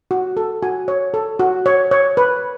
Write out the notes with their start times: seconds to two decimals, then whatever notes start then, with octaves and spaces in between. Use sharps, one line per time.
0.11 F#4
0.37 A4
0.63 F#4 G#5
0.88 C#5
1.14 A4
1.39 F#4
1.66 C#5
1.91 C#5
2.17 B4